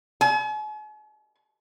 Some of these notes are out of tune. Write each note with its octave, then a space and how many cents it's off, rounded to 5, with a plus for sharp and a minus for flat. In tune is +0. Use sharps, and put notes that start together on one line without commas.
G#5 +45